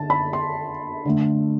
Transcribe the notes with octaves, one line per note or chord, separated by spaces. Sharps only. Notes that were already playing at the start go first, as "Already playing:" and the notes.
Already playing: D3 A5
B5
C6
D3 A3